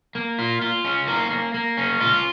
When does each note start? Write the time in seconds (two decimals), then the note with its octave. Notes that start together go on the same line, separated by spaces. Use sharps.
0.15 A#3
0.39 F4
0.61 F4
0.85 C#4
1.08 A#3
1.31 A#3
1.54 A#3
1.77 C#4
2.01 F4